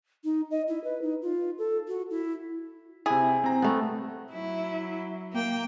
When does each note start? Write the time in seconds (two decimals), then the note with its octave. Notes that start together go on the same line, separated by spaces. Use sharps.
0.24 D#4
0.51 D#5
0.68 E4
0.84 B4
1.02 D#4
1.22 F4
1.59 A4
1.88 F#4
2.11 E4
3.06 C3 E4 G#4
3.44 C4 A#5
3.62 A3 B3
4.32 F#3 E4
5.32 A#3 G5